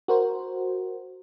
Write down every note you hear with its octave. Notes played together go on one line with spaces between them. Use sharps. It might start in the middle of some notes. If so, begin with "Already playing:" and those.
F#4 A#4 C5